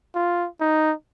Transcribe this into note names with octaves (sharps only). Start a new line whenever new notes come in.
F4
D#4